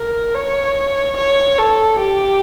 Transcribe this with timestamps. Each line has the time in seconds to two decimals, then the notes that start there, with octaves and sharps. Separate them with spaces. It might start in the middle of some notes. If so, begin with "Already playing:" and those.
Already playing: A#4
0.34 C#5
1.17 C#5
1.58 A4
1.99 G4